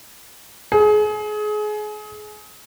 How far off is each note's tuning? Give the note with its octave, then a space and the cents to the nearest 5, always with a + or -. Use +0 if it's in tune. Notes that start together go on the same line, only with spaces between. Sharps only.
G#4 +25